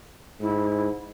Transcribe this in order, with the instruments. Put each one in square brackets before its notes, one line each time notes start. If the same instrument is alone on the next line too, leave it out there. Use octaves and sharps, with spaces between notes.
[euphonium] G#2 [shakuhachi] E4